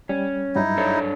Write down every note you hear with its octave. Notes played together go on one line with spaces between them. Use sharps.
G3 C#4
G2 F#3 G3 D#4 E4
D4 A4 C#5